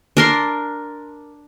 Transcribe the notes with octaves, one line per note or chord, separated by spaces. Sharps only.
D4 A#4 C6